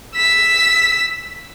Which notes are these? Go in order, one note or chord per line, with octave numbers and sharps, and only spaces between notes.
E6 B6